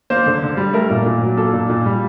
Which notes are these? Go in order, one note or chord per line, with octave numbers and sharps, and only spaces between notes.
A#3 C5
D3
D3
G3
A3 A#4
A#2
A#2
F#3
A#3 A4
A#2
A#2
G3